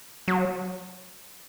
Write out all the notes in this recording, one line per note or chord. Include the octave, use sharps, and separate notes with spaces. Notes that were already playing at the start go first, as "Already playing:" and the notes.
F#3